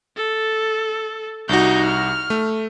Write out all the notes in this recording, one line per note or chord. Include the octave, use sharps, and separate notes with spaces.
A4
C2 D#4 F#4 G6
F6
A3